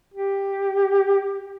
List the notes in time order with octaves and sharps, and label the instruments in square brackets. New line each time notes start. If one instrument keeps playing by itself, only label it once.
[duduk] G4